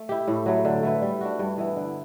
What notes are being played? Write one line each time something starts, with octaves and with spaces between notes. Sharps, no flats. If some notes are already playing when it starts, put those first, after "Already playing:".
Already playing: A3
E4 G4
A2
F#3 A3
D3
A3 E4 B4
G3
D4 F#4
G2
E3 B3 E4
D3